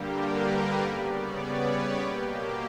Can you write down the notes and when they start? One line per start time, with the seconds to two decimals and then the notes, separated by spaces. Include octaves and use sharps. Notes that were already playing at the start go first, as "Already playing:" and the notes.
Already playing: G2 D3 G3 A#3 G4 A#4
0.22 B4
0.81 C#3 G3 B3 D5
1.11 C#5
1.41 B4
1.70 G4
1.98 B2 A#3 G4